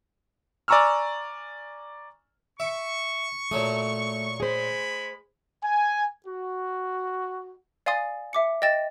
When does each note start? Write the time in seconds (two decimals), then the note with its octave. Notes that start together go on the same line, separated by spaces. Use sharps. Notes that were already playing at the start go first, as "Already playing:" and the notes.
0.68 D5 G#5 A#5 C#6 E6 F6
2.60 E5 C#6
3.51 A#2 F#3 A3 D#6
4.40 G#3 G#4 C5 B5
5.62 G#5
6.25 F#4
7.86 D5 F5 G#5 C6 D#6 A6
8.33 E5 D6 C#7
8.62 D#5 G5 A6 E7